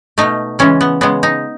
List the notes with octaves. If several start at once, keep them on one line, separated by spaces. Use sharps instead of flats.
B2 A3 D#4
C#3 E3 G#3 C#4
B3
C#3 G#3 B3
D#4